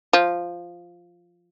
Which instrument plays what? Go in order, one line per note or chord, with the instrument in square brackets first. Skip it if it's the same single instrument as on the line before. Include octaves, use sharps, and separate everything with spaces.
[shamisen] F3